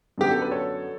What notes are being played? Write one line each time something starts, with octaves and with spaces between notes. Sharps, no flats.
F#2 D3 F#3 B3 G4
A4
B4
A4 C#5